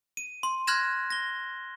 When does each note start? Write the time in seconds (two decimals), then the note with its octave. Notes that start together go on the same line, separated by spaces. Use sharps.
0.17 D#7
0.43 C6
0.67 C6 F6 F#6 G#6 A#6 E7
1.10 A#6 G7